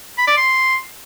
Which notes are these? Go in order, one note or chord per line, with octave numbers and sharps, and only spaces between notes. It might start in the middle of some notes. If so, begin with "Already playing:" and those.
B5
D5
C6